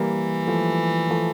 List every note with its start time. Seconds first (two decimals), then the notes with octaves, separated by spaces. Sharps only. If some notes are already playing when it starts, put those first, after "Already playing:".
Already playing: E3 G3 A#3
0.47 F3 A3
1.10 F3 A3